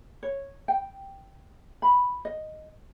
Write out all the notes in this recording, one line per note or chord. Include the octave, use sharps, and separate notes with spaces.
C#5
G5
B5
D#5